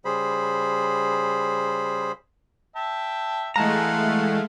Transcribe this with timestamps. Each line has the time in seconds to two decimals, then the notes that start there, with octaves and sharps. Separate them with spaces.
0.05 C#3 G3 G#4 C5 B5
2.76 E5 G5 A5
3.56 E3 G#3 A3 F5 F#5 A5 A#5